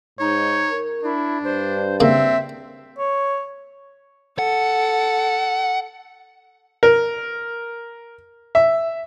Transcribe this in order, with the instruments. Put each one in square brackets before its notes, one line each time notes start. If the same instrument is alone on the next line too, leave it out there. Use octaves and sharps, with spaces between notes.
[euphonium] G#2 [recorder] D#4 [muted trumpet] C#5
[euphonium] A#4
[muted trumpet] D4 [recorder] E4
[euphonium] G2 [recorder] C5
[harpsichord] C#3 A#3 [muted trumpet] C4 [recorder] E5
[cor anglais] C#5
[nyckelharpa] A4 [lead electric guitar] F#5
[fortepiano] A#4
E5